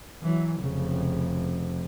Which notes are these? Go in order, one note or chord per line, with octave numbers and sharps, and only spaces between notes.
E3 F#3
F1 C#3